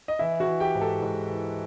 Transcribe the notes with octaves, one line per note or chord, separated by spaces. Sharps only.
D#5
E3 E4 E5
F#4 F#5
E3
G4 G5
G#2
A4 A5
G#2
E3